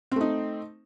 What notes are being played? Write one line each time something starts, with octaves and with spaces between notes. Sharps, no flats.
A3 C4 D#4